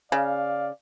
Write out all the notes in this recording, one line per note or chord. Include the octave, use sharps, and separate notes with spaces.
C#3 D5 F5